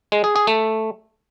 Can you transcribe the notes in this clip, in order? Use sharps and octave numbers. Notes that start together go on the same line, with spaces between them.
G#3
G#4
G#4
A3